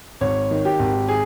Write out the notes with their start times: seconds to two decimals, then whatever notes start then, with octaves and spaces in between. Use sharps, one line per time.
0.21 G#1 C#5
0.51 D#3
0.65 G4
0.80 G#1
1.09 G#4